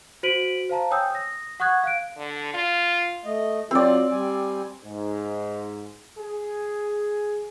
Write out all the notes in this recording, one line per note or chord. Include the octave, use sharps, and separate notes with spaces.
F#4 C5 B6 D7 D#7 F#7
C5 F5 A5 A#5
C#5 G5 G#5 D#6 E6 G6
D#6 A#6
F#5 C#6 D#6 F#6 G#6
F5 F#6 D7
D3
F4
A3 D#5
F#3 C4 F4 D5
G3 G#5
G#2
G#4